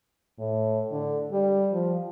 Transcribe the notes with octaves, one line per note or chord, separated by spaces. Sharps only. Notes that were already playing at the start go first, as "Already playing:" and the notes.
A2
D3
G3
F3